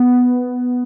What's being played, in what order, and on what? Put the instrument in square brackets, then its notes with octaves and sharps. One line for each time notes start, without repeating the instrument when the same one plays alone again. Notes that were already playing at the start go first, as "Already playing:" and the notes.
Already playing: [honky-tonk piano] B3